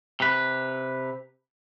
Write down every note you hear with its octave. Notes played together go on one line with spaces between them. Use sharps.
C3 B4